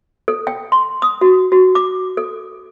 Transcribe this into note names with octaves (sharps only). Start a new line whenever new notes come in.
A4
G5
C6
D#6
F#4
F#4
D6
A4